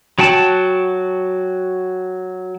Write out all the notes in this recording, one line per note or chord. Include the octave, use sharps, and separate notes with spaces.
F#3 F#4 G5 A5